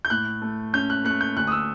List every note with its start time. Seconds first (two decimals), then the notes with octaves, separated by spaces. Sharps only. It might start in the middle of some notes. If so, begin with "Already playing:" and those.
0.05 G6
0.10 A2 F#6
0.42 A3
0.73 C#4 G6
0.90 F#6
1.05 A3 F#6
1.21 G6
1.36 D2 F#6
1.47 D#6
1.52 E6